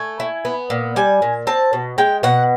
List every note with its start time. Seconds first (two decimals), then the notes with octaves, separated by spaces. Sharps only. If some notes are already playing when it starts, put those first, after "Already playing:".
Already playing: A3 G#5
0.20 E4
0.45 B3
0.70 A#2
0.96 G3 G#5
1.22 A#2
1.47 C4 A5
1.73 B2
1.98 G#3 G5
2.23 B2 F#5